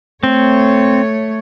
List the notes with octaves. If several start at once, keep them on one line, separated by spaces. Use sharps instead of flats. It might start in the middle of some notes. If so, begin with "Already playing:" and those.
A3 C4 C#5